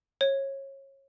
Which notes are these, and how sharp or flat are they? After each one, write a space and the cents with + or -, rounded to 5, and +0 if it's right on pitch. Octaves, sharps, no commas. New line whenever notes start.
C#5 -25